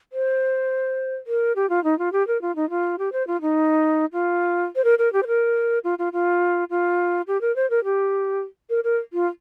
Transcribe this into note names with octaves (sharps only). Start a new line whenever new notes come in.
C5
A#4
G4
F4
D#4
F4
G4
A#4
F4
D#4
F4
G4
C5
F4
D#4
F4
C5
A#4
A#4
G4
C5
A#4
F4
F4
F4
F4
G4
A#4
C5
A#4
G4
A#4
A#4
F4